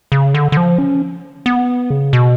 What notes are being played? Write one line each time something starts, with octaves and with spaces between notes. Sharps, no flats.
C#3
D3
D3
F3
C#4
B3
C#3
B2